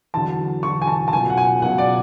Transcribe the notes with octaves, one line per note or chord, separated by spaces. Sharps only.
E2 D3 F#3 A5
E2 D3 F#3 C#6
G#5
A5
A5
C#2 B2 F#3 G#5
F#5
G#5
C#2 B2 F#3 F#5
D5